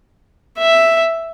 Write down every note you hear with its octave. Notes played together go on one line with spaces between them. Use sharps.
E5